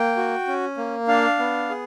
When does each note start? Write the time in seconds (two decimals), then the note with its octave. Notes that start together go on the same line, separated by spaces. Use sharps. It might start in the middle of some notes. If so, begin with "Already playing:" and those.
Already playing: A#3 G5
0.17 F#4
0.47 C#4
0.77 A#3
1.08 D4 F5
1.39 B3
1.69 G#4